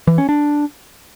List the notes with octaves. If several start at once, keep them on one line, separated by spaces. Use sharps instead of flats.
E3
C#4
D4